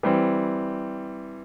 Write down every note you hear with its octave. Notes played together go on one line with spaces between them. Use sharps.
E3 G3 C4